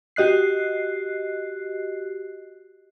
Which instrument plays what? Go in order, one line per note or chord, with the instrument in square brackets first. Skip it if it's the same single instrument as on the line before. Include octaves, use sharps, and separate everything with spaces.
[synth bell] F#4 G4 D#5 F#6 C7